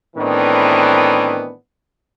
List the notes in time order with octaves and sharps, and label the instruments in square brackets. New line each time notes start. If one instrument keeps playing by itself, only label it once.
[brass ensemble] A2 D#3 E3 B3 C4 D4